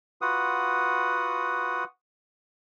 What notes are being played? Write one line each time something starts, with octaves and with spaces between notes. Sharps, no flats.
F4 F#4 B4 F#5 D#6